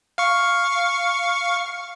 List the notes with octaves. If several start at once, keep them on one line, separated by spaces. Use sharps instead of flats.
F5 C#6